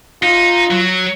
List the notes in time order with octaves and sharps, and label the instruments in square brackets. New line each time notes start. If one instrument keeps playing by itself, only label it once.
[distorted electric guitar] D#4 [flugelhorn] F4
[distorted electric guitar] F#3